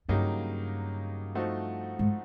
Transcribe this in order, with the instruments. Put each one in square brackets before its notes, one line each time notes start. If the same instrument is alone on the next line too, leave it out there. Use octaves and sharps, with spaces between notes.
[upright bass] G2 [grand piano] C#3 F#3 A#3 D#4 G4
[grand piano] F3 A3 C4 D#4 F#4
[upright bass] G#2